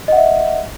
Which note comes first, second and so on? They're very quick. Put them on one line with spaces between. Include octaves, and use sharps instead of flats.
D#5 F#5 E5